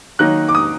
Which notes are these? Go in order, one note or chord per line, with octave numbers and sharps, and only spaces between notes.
D#3 F#3 A#3 D#4 F#6
D6
D#6